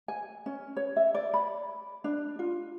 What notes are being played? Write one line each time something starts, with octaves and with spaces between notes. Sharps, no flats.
G#5
C#4
C#5
E5
D5
B5
D4
F4